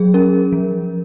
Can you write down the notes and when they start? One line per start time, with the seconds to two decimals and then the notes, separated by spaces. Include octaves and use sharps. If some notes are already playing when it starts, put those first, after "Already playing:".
Already playing: F#3 G#4
0.14 C#4 A#4
0.52 F3